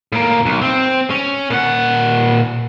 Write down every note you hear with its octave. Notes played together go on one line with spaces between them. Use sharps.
A2 A#3
B1
C4
C#4
A#2 F#5